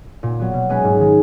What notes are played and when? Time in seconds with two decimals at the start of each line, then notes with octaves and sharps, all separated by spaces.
0.23 A#2
0.39 F#3 B3
0.54 B2
0.69 G#3 C#4 G#4 B4
0.84 G#2
1.00 D#3 G#3